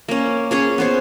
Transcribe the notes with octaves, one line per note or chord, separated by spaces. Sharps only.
A#3 C#4
C#4 G#4 C#5
B3 C5 C#5